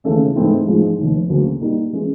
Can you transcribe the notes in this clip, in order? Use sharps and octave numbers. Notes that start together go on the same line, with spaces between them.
D#2 C#3 E3 A3 C#4
G#2 E3 A3 C4 E4
A1 G#2 F3 G#3
F1 D#2 D#3
D2 C#3 F#3 A#3
A#2 G3 A#3 D#4
E3 G#3 C#4